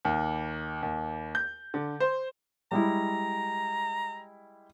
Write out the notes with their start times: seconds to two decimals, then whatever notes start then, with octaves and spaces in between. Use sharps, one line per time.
0.05 D#2
0.82 D#2
1.35 G6
1.74 D3
2.00 C5
2.72 G3 G#3 E4 A#5